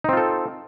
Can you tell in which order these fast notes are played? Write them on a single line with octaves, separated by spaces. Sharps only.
D#4 C4 F4 A4